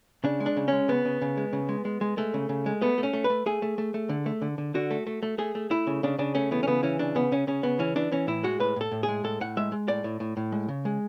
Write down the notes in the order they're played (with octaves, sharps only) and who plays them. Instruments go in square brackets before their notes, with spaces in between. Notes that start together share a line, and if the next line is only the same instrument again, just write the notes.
[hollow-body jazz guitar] C#3 D4
G#3
D4
C#3
G#3 C#4
C#3 B3
C#3
C#3
G#3
C#3
G#3
G#3
G#3
G#3 A3
C#3
C#3
G#3
A3 B3
A3
C#4
A3
B4
A3
A3 G#4
A3
A3
A3
D3
A3
D3
D3
D3 F#4
A3
A3
A3
A3 G#4
A3
A3 E4
C#3
C#3 D4
C#3 D4
A3 C#4
E3 B3
C#4
C#3 B3
E3 C#4
C#3 D4
C#3 B3
C#3 C#4
C#3 C#4
C#3 B3
E3 C#4
E3 D4
E3 C#4
A2 E4
G#3 F#4
A2 B4
A2 A4
A2
G#4
G#3
A2 A4
A2 F#5
G#3 E5
G#3
A2 D5
A2
A2
A2
G#3
C#3
G#3